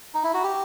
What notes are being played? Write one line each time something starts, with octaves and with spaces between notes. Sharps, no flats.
D#4
E4
F#4
G4